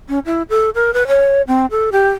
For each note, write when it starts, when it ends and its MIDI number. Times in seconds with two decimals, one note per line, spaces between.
0.09 0.19 61
0.26 0.42 64
0.50 0.70 69
0.75 0.93 70
0.94 1.07 71
1.08 1.42 73
1.48 1.66 60
1.71 1.90 69
1.92 2.08 67